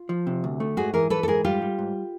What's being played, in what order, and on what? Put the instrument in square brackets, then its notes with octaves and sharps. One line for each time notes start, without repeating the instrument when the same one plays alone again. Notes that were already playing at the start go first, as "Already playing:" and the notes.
Already playing: [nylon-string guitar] F4
[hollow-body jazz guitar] F3
C3
D2
A3
[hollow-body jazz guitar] G#2 [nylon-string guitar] F#4 G#4
[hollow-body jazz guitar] E3 [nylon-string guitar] G#4 A#4
[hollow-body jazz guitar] E3 [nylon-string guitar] A4 B4
[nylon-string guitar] A4
[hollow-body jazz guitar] G#2 [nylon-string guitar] G#4 A#4
[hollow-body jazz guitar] G3 [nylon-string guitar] F4 G4
[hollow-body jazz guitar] G3
G#2